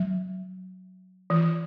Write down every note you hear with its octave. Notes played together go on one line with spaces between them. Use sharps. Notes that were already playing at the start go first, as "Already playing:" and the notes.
Already playing: F#3
E3